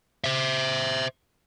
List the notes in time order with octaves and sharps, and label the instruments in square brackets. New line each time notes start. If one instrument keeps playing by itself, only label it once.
[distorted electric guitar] C5 E5